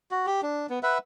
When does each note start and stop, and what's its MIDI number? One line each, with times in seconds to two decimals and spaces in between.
0.11 0.26 66
0.26 0.41 67
0.43 0.66 62
0.70 0.79 59
0.83 0.98 71
0.83 0.98 76
0.83 0.98 78